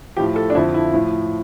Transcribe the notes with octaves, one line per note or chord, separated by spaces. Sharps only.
A2 F3 G4
A4
D4
F2 D3 F3 E4
E4
A2 F3